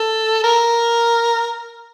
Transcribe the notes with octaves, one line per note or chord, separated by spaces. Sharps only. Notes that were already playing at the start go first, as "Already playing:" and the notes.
Already playing: A4
A#4